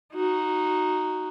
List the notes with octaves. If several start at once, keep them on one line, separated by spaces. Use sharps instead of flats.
D#4 F#4